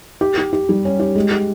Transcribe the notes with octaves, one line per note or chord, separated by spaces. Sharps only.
G4
G4
G4
G3
C#4
G4
G#3
G4